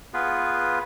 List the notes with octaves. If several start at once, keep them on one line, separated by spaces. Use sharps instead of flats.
B3 F4 G#4 B4